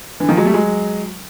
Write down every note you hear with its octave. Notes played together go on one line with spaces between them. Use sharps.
D3 E3
D#3 F3
F#3 G#3
G3 A3
F#3 G#3